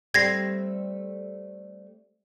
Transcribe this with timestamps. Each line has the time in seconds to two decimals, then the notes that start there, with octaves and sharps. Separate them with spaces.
0.14 G3 A3 C4 G#6 A#6 C7